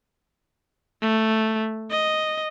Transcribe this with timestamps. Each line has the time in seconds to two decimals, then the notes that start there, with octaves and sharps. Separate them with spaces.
1.02 A3
1.91 D#5